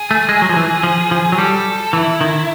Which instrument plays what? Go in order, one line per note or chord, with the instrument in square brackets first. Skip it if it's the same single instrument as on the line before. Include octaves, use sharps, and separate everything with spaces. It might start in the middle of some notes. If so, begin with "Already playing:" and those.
Already playing: [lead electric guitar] G#4
[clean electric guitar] A3
G#3
F#3
F3
E3
F3
F3
F#3
[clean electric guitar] G3 [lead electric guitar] A4
[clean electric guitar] E3 [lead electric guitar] E4
[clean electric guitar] D#3